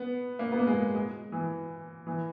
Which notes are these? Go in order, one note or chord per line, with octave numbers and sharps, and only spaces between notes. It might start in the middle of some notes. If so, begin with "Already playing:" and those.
Already playing: B3
A#3
B3
A#3
G#3
G#3
E3
E3